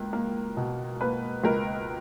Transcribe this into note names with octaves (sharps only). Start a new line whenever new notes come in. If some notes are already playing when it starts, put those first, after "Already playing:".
Already playing: C#2 A#3
A#3
B2
A#3 B4
C#2 A#4